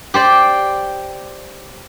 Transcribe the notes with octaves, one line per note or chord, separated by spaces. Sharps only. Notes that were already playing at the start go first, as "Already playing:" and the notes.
G4 C5 D5